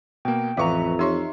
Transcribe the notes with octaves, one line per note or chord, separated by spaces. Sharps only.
B2 A#3 G5
A1 F2 E3 B4 E5 F5 A#5 C#6
D#4 G4 C#5 E5 C6 C#6